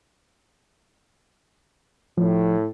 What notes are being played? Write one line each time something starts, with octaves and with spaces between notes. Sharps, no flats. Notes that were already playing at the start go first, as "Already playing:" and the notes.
A2 F3